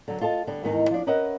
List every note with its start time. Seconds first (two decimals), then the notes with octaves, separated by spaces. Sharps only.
0.08 D3 F#3
0.21 F4 A4 D#5 A5
0.47 D3 G3 B3
0.63 E2 G#2 D#3 B3 D#4
0.91 F3 D4
1.07 C#4 A#4 B4 D#5 E5 F#5